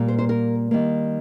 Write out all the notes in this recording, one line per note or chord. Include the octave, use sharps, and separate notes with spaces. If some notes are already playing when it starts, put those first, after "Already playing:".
Already playing: A#2 G3 A#3
C5
C5
A#4
D#3 G3 A#3